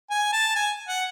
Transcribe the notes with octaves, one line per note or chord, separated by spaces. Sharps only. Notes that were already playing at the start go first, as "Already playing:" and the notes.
G#5
A5
G#5
F#5